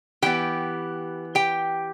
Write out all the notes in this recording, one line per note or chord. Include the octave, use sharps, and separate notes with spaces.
E3 B3 G4 G5
G4 G5